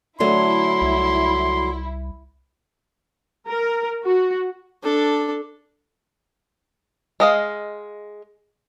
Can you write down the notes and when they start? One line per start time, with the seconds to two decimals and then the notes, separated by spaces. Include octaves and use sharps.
0.20 D3 F#3 A3 E4 C6
0.82 C2
3.48 A#4
4.04 F#4
4.84 D4 A4
7.20 G#3 D#5 F5